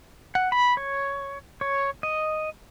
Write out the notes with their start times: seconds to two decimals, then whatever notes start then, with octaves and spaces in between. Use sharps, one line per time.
0.35 F#5
0.52 B5
0.77 C#5
1.61 C#5
2.03 D#5